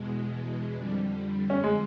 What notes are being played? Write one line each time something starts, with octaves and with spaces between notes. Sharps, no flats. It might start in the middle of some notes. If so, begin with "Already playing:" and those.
Already playing: E2 B2 G#3
F2 D3 G3
C#4
G#3